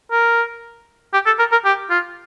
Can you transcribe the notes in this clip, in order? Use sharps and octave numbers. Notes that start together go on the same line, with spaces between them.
A#4
G4
A4
A#4
A#4
G4
F4